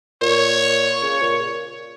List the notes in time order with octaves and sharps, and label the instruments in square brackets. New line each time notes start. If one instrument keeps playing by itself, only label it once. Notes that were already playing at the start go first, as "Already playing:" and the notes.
[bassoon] A#2 [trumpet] C#5
[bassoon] C#3 [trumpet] C#5
[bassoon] A#2